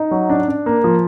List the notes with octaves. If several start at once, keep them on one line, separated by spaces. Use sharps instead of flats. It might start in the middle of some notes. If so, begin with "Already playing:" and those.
Already playing: D#4
F#3
D4
D4
A#3
F3